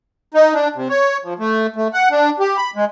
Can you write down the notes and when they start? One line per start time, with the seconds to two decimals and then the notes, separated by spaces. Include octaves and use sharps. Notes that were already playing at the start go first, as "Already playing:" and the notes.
0.34 D#4
0.54 D4
0.75 C3
0.89 C#5
1.24 F3
1.39 A3
1.76 A3
1.94 F#5
2.11 D4
2.40 G4
2.57 B5
2.76 G#3